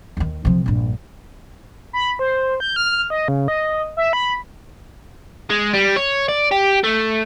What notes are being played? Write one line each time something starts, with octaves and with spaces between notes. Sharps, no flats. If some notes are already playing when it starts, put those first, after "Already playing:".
D#2 D#3
C3 F3
A#1 G2
B5
C5
G6
F6
D#5
C#3
D#5
E5
B5
G#3
G3
C#5
D5
G4
A3